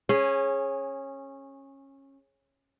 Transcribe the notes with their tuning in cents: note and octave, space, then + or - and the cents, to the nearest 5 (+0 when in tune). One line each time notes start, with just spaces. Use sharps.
C#4 -20 G#4 +0